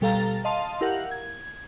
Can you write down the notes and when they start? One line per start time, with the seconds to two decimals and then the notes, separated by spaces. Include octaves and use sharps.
0.01 B2 G3 A4 F5 A#5 A6
0.45 D#5 F5 A5 C6
0.81 E4 G4 A#4 F5 F#5
1.11 G#6